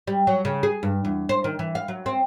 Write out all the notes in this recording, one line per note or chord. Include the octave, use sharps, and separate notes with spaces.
G3
F#3
C#3
G#4
G2
E2
C5
D#3
E3
F5
F#3
C4